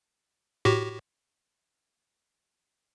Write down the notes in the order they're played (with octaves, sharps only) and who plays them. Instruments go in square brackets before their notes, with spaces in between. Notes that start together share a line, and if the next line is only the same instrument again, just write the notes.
[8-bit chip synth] A2 F#4 G4